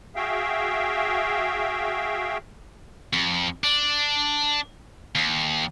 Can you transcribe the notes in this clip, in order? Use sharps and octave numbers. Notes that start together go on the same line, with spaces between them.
F#4 G#4 E5 F5 G5
F2
D4
D#2